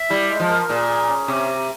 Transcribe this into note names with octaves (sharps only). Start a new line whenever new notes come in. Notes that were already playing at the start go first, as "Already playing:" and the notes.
Already playing: E5
G3 E4
G#3
F3
A#4
A#2 G#4
G#4
C#4
C3 G4
G4